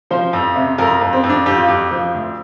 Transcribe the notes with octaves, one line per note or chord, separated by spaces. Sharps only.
F3 C5
F2
C3
F2 A#4
F2
C4
F2
D4
F2 G4
F4
F2 G4
F3
D2